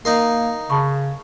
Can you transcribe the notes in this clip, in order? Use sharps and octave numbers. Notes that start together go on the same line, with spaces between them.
A#3 D#4 A#4 D#5 C6
C#3 A5 B5 C#6